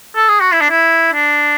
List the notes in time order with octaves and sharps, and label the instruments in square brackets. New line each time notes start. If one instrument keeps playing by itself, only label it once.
[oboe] A4
G#4
F#4
E4
D4
E4
D4